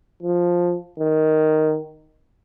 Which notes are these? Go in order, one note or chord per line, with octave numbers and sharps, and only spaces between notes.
F3
D#3